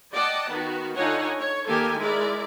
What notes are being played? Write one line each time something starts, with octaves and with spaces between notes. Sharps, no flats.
D5 D#5 F#5 G5 A5
D#3 B3 F#4
D3 D#4 F4 C#5 F#5 G#5
C#5
D#3 A#3 G4 A4 G#5
G#3 E4 A#4 D5